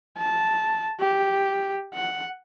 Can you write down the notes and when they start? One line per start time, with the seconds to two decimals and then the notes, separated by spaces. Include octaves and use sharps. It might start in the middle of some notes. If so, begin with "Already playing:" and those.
0.18 A5
1.00 G4
1.94 F#5